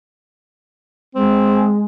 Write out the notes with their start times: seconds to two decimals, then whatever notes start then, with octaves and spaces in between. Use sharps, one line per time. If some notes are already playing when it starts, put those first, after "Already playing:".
1.15 G#3 C4